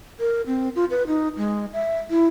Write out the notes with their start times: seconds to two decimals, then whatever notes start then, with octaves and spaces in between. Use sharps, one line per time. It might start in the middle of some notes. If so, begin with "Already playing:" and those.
0.20 A#4
0.47 C4
0.76 F4
0.90 B4
1.07 D#4
1.37 G#3
1.73 E5
2.10 E4